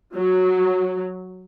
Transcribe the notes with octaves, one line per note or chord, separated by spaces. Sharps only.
F#3